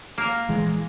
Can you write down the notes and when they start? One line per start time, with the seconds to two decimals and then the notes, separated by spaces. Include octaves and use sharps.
0.18 A#3 A#4
0.49 A#1 E3 G#3